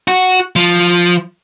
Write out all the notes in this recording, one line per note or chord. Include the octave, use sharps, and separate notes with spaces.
F#4
F3